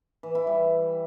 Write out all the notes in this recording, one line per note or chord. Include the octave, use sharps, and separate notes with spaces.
E3
E4
G3